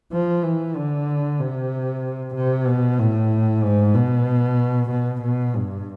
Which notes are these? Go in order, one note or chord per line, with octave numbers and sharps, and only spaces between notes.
F3
E3
D3
C3
C3
B2
A2
G#2
B2
B2
B2
G2